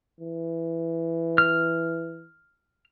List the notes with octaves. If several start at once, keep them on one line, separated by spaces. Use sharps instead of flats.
E3
F6